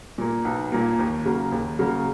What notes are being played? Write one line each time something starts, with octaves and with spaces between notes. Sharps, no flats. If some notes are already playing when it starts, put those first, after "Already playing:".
A#2 A#3
B1
A#2 A#3
D#2
C#3 F#3 A#3
D#2
C#3 F#3 A#3